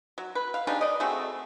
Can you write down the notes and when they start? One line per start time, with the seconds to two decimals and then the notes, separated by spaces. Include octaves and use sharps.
0.18 F#3
0.35 B4
0.54 F5
0.67 C#3 G3 D4 D#4
0.81 D5 D#5
1.00 A3 C4 F#4 G#4